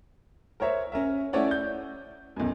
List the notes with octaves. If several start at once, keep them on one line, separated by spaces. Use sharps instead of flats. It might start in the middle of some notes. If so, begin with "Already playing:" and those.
A#4 C5 C#5 E5
C#4 A#4 E5
A3 C#4 E4 C#5 D5 F#5
G6
B1 F#2